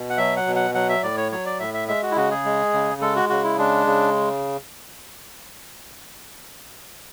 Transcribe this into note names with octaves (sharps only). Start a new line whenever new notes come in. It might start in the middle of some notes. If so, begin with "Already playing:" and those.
Already playing: B2
F#5
F#3 E5
F#5
B2
F#5
F#3 F#5
E5
A2 D5
C#5
F#3 C#5
D5
A2 E5
E5
G#3 E5
F#4
E4
C#3 F#4
G#4
G#3
C#3
G#3 A4
F#4
C#3 F#4
E4
G#3 D4
C#3